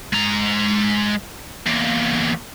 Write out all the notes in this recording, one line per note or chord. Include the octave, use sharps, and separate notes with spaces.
G#3 A#5
E2 A#3